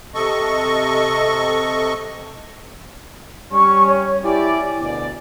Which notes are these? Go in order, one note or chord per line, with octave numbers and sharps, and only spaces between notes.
C3 A4 D#5 C#6
G3 C#4 C#6
C#5
E4 G4 D5 G#5
D2 B2 D5